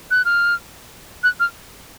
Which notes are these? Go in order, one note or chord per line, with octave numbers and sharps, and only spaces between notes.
F#6
F6
F#6
F6